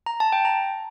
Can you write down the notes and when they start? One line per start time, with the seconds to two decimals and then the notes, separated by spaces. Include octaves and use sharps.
0.06 A#5
0.20 A5
0.32 G5
0.45 A#5